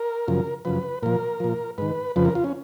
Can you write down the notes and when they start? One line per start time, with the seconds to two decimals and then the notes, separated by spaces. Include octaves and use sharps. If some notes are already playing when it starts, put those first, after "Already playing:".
Already playing: A#4
0.28 F#2 C#3 F3
0.65 F#2 C#3 F3 B4
1.03 A#2 F3 A#4
1.40 A#2 F3
1.78 G#2 D#3 B4
2.16 F2 C#3 F3 B4
2.25 A#4
2.35 F4
2.44 C#4